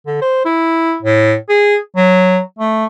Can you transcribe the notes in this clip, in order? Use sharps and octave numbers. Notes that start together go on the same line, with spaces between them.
D3
C5
E4
A2
G#4
F#3
A3